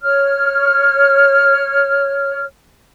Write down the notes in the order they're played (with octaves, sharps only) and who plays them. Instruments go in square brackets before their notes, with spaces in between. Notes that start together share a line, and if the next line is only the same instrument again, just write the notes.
[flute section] C#5 F6